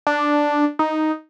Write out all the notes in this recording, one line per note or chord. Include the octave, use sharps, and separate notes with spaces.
D4
D#4